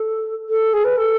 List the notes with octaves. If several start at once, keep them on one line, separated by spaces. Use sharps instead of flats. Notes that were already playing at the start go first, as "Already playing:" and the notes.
Already playing: A4
A4
G#4
B4
A4